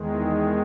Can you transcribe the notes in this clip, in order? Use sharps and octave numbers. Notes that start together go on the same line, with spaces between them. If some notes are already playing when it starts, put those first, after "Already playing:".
Already playing: E2 D#3 G#3
E4